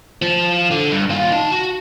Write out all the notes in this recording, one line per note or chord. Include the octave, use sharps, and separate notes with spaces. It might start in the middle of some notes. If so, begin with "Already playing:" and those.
F3
D3
G2
D#2 F4
D#4 A5
F#4